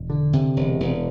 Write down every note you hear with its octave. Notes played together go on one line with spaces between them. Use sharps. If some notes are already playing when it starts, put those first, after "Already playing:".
Already playing: E1
D3
C3
E1
E1